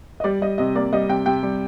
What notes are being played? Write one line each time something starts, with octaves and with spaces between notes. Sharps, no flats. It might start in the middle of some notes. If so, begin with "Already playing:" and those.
D#5
G3 D5
G3 D#5
C3 D#5
A#3 D5
G3 D#5
C3 G5
C3 G5
G3